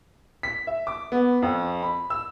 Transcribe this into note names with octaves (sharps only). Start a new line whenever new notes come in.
B6
E5
D6
B3
F2
B5
E6